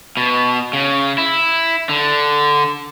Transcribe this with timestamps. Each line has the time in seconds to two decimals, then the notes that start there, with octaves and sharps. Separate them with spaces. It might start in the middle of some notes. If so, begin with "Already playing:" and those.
0.17 B2
0.73 C#3
1.18 E4
1.89 D3